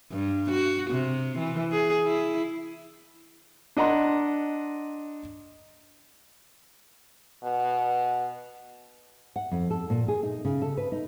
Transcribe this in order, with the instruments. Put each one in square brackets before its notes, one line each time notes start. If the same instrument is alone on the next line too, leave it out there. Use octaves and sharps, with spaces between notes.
[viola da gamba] G2
F#4
C3
E3
G#4
E4
[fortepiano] D4 D#5 F#5 A#5 C6
[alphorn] B2
[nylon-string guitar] F#5
F2
A4
A#2
G#4
D#4
C#3
A4
B4
D#4